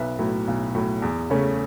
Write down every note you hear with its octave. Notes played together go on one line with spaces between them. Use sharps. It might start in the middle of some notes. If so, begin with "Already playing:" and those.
Already playing: B1 B4 E5
A2 F#3
B1
A2 F#3
E2
C#3 A3 C#4